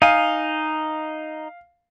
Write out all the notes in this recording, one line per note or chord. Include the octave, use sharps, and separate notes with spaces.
D#4 F5 G#5